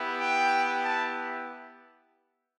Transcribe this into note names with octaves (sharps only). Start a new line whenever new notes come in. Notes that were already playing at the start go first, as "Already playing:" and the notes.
Already playing: B3 E4 G4
G5
A5